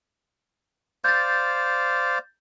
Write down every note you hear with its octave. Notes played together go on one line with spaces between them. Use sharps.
C5 D5 F5 G6 A6